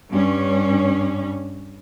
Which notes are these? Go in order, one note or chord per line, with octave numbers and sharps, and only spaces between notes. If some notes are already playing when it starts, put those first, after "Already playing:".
G2 C#4